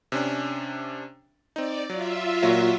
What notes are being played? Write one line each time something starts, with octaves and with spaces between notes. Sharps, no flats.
C3 C#4 D4
C4 D#4 D5
F#3 F4 E5
A#2 F#3 F#4